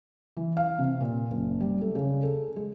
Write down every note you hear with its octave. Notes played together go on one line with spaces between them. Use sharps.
E3
F5
C3
A#2
F#1
G3
A3
C#3
A4
G#3